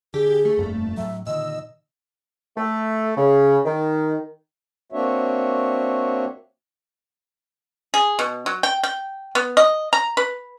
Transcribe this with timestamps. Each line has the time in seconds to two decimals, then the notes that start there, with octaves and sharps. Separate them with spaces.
0.14 D3 G4 G#4
0.45 A3
0.58 F1 G2 A#2
0.97 A2 F#3 E5
1.27 A#2 D3 D#3 D#5 E6
2.57 A3
3.17 C#3
3.65 D#3
4.92 A#3 C4 D4 F#4 C#5 E5
7.94 G#4
8.19 B2
8.46 F#3
8.63 G5
8.83 G5
9.35 B3
9.57 D#5
9.93 A#5
10.17 B4